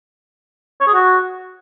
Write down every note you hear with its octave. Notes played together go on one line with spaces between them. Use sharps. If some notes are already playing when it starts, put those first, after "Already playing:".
C#5
G#4
F#4